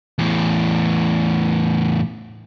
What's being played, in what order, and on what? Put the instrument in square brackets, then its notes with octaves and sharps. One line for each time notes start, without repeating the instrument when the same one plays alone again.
[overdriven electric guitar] E2 A2